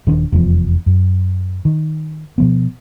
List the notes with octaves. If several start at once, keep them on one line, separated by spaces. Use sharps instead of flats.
D#1 D#3 C#4 D4
F1 E2 B2 F3
F#2
D#3
B2 F3 B3